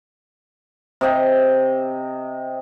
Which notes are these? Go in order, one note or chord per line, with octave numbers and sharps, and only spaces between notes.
C3 D#5 G5